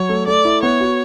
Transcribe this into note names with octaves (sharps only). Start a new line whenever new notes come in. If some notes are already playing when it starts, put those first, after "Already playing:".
Already playing: F#3 C#5
A3
A3 D5
E4
B3 C#5
F#4